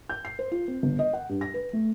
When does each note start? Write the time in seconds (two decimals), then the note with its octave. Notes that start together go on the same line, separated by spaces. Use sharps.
0.09 G6
0.25 C7
0.39 C5
0.51 F4
0.68 C4
0.83 G1
0.99 D#5
1.13 F#5
1.29 G2
1.41 A#6
1.54 B4
1.73 A3